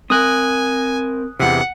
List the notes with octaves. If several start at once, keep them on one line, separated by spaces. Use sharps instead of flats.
C4 A#4 G#5 D#6 F#6
E2 C3 F#5